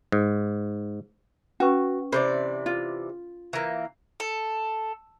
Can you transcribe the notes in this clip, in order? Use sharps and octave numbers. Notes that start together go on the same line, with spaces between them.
G#2
C#4 F#4 B4 C#6
C3 E3 C5 D5 B5
F4
E3 A#3
A4